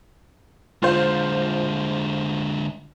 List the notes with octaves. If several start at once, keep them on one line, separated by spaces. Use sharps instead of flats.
D3 G#3 F4 C5